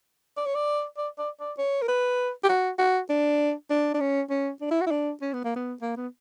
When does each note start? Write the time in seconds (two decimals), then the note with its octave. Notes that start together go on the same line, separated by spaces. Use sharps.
0.37 D5
0.46 C#5
0.55 D5
0.98 D5
1.19 D5
1.40 D5
1.58 C#5
1.82 A#4
1.88 B4
2.44 G4
2.49 F#4
2.79 F#4
3.10 D4
3.70 D4
3.94 D4
4.00 C#4
4.30 C#4
4.61 D4
4.71 E4
4.81 F#4
4.86 E4
4.91 D4
5.22 C#4
5.33 B3
5.44 A#3
5.56 B3
5.82 A#3
5.97 B3